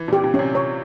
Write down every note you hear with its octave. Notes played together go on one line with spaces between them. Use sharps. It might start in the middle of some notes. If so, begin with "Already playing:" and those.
Already playing: E3
A#2 G4
A#2
C#4
C3
C3 C#5